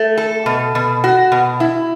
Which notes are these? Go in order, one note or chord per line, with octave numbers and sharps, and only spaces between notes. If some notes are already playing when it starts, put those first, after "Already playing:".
Already playing: A3
A4
B2
B2
F#4
B2
E4